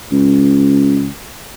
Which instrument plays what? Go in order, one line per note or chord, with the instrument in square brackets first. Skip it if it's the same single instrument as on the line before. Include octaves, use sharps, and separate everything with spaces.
[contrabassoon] C#2